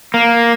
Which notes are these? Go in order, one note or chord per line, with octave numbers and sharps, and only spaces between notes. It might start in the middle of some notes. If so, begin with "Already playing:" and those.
A#3